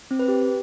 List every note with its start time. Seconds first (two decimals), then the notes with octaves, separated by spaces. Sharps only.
0.11 C4
0.19 B4
0.28 G4